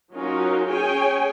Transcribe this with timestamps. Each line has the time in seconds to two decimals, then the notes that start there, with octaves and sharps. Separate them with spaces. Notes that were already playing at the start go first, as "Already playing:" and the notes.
0.13 F#3 C#4 D#4 F4 F#4 A#4
0.69 C#4 G#4 C#5 G5 G#5